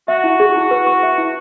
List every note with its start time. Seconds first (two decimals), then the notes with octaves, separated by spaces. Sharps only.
0.08 F#4 E5
0.24 E4
0.40 G#4
0.56 E4
0.71 B4
0.87 C#6
1.03 E5
1.18 E4